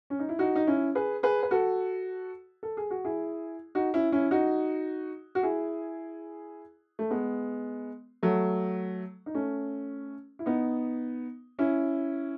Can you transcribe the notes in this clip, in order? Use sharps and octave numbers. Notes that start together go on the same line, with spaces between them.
C#4
D#4
E4
D#4 F#4
D#4
C#4 E4
G#4 B4
G#4 B4
B4
F#4 A4
A4
G#4
F#4
E4 G#4
D#4 F#4
C#4 E4
C#4 E4
D#4 F#4
F#4
E4 G#4
A3
G#3 B3
F#3 A3
D#4
A3 C#4
E4
B3 D#4
C#4 E4